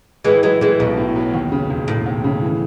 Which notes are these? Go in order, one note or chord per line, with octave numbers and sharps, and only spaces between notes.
A2 E3 G#3
E3 F#3 G#3
E3 G#3 A3
B1 B2
A2
F#3
D#2
C#3
E1
E1 A2
D#2
C#3
E3